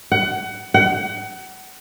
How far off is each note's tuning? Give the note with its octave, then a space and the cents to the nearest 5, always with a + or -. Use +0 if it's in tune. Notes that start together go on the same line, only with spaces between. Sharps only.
F#5 +25
F#5 +30